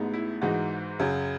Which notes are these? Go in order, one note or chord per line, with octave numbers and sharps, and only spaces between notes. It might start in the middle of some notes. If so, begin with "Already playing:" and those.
Already playing: A1 A2 G#3 B3 D#4
E4
G#2 E3 G#3 D#4 F#4
F#2 C#3 F#3